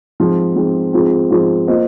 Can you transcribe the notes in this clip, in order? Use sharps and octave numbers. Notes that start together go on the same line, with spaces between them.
G#2 F3 C4
G#2 F3 C4
G#2 F3 C4 F4
G#2 F3 C4 F4
A#3 F4 C5 D#5